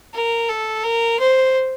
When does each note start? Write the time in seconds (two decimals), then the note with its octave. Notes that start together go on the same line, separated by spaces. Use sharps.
0.14 A#4
0.49 A4
0.84 A#4
1.19 C5